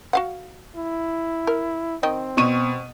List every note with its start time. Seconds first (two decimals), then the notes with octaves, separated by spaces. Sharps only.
0.13 F#4 F5 F#5
0.75 E4
1.47 A#4
2.03 D#3 C4 D#5 G5
2.37 B2 C#6 D#7